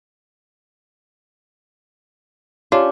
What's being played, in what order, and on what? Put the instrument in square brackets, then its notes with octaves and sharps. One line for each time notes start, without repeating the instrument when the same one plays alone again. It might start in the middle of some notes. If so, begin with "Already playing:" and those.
[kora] C#4 D4 G4 [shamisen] F4